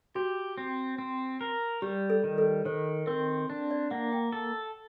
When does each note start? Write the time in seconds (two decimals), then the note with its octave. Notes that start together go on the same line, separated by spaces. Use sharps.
0.15 F#4 G4
0.58 C4
0.98 C4
1.41 A#4
1.82 G3 G4
2.10 A4
2.24 D#3
2.38 A4
2.65 D#3 C5
3.07 C4 A#4
3.50 D4
3.71 D5
3.91 A#3 F#5
4.12 G5
4.32 A4 A5